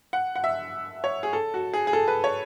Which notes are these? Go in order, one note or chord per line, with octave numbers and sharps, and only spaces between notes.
F#5
F#5
E5
C#5
G#4
A4
F#4
G#4
G#4
A4
B4
C#5